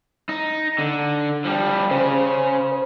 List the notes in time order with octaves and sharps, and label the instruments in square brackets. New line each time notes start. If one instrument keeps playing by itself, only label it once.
[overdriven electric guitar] D#4
D3
F3 G3
[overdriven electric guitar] C#3 [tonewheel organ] C5